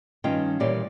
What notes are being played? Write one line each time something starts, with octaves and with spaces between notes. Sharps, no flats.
G2 D#3 C#4 F4 D#5 G5
A#2 E3 G3 G4 C#5 D5